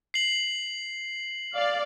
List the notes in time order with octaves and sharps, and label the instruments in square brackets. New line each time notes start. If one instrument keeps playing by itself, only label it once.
[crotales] C7 F#7
[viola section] D5 F5